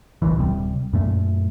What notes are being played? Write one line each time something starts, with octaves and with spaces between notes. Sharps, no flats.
D1 A#1 D#2 E3
D1 C3 G3
F#2 A#2 A3